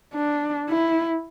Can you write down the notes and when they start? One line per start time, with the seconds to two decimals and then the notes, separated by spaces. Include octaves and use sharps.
0.14 D4
0.70 E4